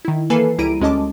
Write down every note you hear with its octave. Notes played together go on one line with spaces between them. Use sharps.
D#3 E4
E3 A#3 A4 B4 G#5 C7
C#2 G3 E4 A#5 D7 D#7
D2 G#3 C#4 D#5 A5 D6